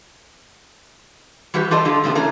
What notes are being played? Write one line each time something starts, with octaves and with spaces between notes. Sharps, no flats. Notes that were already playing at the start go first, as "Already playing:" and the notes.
E3 G3 F#4 G4 B4
E3 F4 G4 A4 D5 D#5
D3 F4 A4
C#3 A3 B3 G4
E3 A3 C#4 A#4